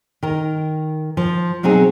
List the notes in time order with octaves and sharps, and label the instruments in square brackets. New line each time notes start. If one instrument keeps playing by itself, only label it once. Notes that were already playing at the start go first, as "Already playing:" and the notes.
[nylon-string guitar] D#3 A#4
F3
B2 F#3 C4 D#4 G#4